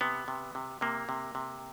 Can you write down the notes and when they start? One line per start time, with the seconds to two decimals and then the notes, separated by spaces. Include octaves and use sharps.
0.01 C3 B3
0.28 C3
0.55 C3
0.81 C3 A#3
1.09 C3
1.35 C3